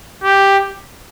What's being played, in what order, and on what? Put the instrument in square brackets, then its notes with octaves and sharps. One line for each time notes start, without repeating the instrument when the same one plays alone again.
[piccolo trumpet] G4